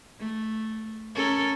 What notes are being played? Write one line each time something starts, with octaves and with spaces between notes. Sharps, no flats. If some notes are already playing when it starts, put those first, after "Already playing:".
A3
C#4 A4 A#4